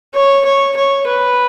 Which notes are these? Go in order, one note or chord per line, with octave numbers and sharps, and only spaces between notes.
C#5
C#5
C#5
B4